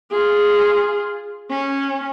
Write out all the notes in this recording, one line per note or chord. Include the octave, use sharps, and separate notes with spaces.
F4 G#4
C#4